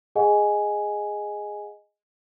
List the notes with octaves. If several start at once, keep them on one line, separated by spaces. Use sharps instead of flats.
G#4 D#5 F#5 G#5